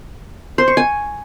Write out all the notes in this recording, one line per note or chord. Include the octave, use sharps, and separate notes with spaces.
C5
C#6
G#5